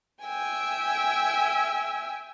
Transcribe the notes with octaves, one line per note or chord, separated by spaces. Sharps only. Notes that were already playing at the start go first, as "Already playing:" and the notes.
E5 G5 G#5